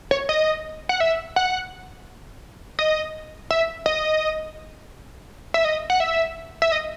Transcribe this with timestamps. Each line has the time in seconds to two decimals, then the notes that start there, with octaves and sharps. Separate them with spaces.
0.11 C#5
0.29 D#5
0.89 F#5
1.00 E5
1.36 F#5
2.79 D#5
3.51 E5
3.86 D#5
5.54 E5
5.65 D#5
5.90 F#5
6.00 E5
6.62 E5
6.72 D#5